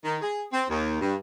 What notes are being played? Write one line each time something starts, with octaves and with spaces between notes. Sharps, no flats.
D#3
G#4
C4
D#2
G2